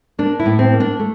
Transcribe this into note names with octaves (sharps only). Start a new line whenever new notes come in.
A#3 D4
E4
A2
C4
A#3
D4
A3